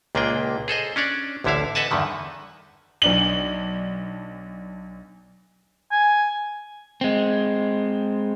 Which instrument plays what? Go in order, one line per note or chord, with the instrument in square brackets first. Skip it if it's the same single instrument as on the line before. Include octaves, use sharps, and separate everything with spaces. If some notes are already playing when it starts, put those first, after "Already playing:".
[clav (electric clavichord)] C#2 A#2 A#3 D4 G#4 G5
G#4 A4 C5 D#5
C#4 D4 C#5 D5
A1 D2 D3 E4 E5 F5
A4 B4 D#5 F#5 G#5 A5
E2 G2 D3 D#3
[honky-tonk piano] B1 D4 F#7
[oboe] G#5
[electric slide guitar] G#3 C4